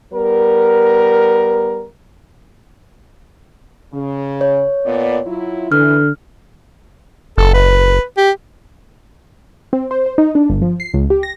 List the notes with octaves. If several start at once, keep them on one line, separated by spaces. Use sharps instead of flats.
G3 B3 A#4
C#3
C#5
A#2 B3 D5
F#3 E4 F4
D3 E3 F6
F#1 A4
B4
G4
C4
C5
C5
D#4
D4
G1
F3
C7
C#2
G4
A#6